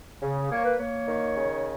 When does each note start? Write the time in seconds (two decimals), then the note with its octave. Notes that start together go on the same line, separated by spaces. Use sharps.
0.22 C#3
0.51 A#3 C#5
0.64 B4
0.77 A#3 C#5
1.08 D#3
1.37 C#3